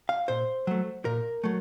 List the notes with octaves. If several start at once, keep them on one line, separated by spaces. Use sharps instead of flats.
F5
A#2 C5
F#3 A3
A#2 A#4
F#3 A3